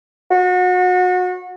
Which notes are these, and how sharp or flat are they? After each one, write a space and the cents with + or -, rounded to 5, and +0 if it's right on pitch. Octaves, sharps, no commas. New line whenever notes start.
F#4 -30